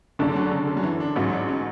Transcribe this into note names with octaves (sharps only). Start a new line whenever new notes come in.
F#1 F#2 D3 A3 D4
F#3
C#3
C#3
F#3
E3
D4
A1 G#2 F#3 C#4
D4
C#4